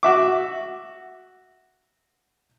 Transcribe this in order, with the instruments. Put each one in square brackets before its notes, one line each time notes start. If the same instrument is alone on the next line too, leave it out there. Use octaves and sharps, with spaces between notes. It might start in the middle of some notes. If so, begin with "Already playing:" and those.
[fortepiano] F#4 E5 D6